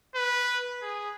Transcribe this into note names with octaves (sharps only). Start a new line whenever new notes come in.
B4
G#4